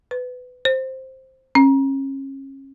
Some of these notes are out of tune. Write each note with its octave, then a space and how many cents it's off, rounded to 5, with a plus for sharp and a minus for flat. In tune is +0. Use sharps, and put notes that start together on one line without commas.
B4 +20
C5 +5
C#4 -35